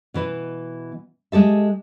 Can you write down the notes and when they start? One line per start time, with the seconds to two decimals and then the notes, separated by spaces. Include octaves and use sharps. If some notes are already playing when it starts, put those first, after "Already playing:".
0.14 B2 E3 B4
1.32 G#3 G4 A4 E5